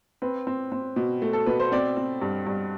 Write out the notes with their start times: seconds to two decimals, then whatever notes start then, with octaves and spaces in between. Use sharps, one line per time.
0.22 C4 B4
0.47 C4
0.72 C4
0.96 B2
1.22 A3
1.33 A4
1.46 B2 B4
1.60 C5
1.72 C4 D5
1.97 C4
2.22 G2
2.47 G2